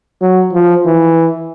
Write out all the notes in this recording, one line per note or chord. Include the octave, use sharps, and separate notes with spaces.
F#3
F3
E3